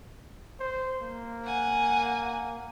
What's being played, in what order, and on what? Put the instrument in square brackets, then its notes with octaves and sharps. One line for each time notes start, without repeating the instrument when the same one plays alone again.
[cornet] C5
A#3
[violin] F#5 G#5